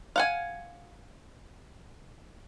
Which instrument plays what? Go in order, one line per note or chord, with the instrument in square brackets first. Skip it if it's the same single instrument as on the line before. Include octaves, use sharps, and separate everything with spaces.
[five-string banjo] F5 F#5 G#5